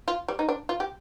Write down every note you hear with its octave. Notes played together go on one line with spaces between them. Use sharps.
F4
G3
D#4
D4
F4
G4